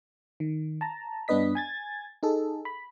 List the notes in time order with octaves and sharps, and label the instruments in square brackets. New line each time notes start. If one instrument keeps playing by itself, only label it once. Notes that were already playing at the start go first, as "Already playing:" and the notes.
[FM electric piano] D#3
A5 A#5
G2 B3 D4 B4 D#5 B6
G#5 G#6 A6
D#4 G#4 A4
B5